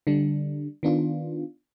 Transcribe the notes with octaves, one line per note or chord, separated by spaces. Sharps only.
D3 G3 D4
D#3 B3 D4 F4